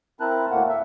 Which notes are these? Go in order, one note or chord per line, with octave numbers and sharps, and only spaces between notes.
C4 E4 A#4 A5 F#6
D2 A2 A3 A#3 F#5
E5